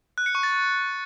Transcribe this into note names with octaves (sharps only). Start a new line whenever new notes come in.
F#6
C#7
C#6
A6